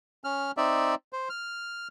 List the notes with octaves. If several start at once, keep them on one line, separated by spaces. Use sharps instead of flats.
C#4 F6
C4 D#4 D5 E5
C5
F6